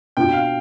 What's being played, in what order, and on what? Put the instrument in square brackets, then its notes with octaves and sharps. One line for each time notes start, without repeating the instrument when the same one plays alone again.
[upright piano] B2 B3 D4 F4 [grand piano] G5
[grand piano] F5